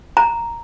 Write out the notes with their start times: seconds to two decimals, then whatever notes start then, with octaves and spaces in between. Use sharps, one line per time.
0.17 A#5